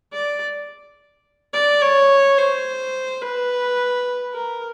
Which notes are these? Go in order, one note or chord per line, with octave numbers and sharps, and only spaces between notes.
D5
D5
C#5
C5
B4
A#4